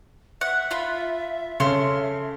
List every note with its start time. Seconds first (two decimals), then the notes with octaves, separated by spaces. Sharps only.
0.41 E5 F#5
0.71 F4 B5
1.60 C#3 A4 C6 F6